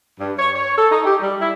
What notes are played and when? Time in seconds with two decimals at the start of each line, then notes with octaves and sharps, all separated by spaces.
0.20 G2
0.38 C#5
0.56 C#5
0.77 A4
0.91 D#4
1.05 G4
1.21 G3
1.41 E4